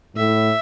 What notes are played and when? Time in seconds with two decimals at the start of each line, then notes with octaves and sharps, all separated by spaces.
0.16 A2 E5